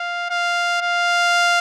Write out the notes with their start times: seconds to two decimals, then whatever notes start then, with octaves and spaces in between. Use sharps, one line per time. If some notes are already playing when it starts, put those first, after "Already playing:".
Already playing: F5
0.30 F5
0.82 F5